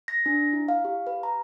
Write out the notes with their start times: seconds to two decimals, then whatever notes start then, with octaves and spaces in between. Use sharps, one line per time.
0.08 A#6
0.26 D4
0.53 E4
0.68 F5
0.85 G4
1.07 B4
1.23 A#5